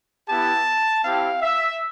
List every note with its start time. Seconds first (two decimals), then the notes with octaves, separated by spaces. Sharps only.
0.28 B3 E4 G4 A5
1.03 C4 E4 G4 F5
1.42 E5